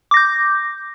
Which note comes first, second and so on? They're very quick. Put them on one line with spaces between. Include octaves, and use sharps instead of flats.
D6 A#6 G6